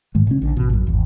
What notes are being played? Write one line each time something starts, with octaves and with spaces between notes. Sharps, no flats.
G#2 D#3 G#3
A#2 C#3 C#4
A#1 D3
A1 B2
A#1 F#2
G#1 E2